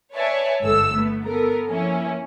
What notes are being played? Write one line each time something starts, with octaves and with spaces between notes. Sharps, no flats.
B4 C#5 D5 E5 G#5 A5
G1 G#2 A4 E6
A3 B3
B3 A4 A#4
F3 A#3 C#4 E4